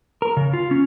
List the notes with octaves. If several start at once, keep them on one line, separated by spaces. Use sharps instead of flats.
A#4
C#3
F4
C#4